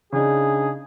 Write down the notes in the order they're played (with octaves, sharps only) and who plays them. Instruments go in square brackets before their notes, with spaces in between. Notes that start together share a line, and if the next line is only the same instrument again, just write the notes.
[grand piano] C#3 D4 D#4 [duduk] G#4